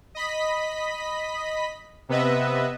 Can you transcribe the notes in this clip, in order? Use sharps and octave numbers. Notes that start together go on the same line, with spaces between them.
D#5 B5 B6
C3 B3 B4 D#5 E5